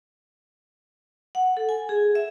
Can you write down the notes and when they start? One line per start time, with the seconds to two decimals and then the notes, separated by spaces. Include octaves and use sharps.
1.35 F#5
1.57 A4
1.69 G#5
1.89 G#4
2.15 E5